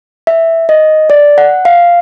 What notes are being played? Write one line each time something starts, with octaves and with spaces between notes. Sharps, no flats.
E5
D#5
D5
F#5
F5